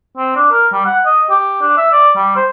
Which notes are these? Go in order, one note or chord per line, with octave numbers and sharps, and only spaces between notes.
C4
D4
A#4
G3
F#5
D#5
G4
D4
E5
D5
G3
C5